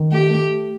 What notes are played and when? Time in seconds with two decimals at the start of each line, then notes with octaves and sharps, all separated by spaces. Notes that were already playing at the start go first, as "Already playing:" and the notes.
Already playing: D#3
0.12 A3 G4
0.30 A3